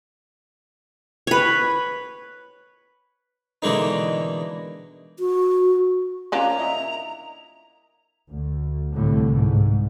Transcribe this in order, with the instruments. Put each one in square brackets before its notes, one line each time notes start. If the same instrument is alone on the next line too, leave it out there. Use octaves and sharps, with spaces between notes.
[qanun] B4 C#5
[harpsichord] B2 D3 E3 G#3 A#3 D#4
[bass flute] F#4
[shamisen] D3 A#3 D4 [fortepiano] C#4 F4 G#5 [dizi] A#5
[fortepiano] E4 D#5 E5
[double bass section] D2
C2 A2 D3
G#2